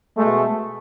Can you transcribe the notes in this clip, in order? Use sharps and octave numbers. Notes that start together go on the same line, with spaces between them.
B2 G#3 A3